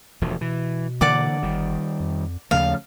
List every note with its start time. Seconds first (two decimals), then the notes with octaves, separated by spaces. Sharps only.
0.22 E1 D2 F3
0.41 B2 E3
1.01 D3 E3 A#3 D5 F#5 D6
1.43 G1 D#3 G3
2.00 F2
2.51 D#2 C#3 F3 A3 F5